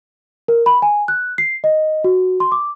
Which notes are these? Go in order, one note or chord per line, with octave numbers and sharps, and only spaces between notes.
A#4
B5
G#5
F#6
C7
D#5
F#4
C6
D6